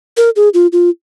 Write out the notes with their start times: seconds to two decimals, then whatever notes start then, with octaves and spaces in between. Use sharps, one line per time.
0.17 A#4
0.36 G#4
0.54 F4
0.73 F4